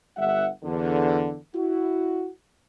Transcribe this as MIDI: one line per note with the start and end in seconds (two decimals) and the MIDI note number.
0.17 0.48 31
0.17 0.48 43
0.17 0.48 76
0.17 0.48 78
0.63 1.35 40
0.63 1.35 50
1.55 2.28 64
1.55 2.28 66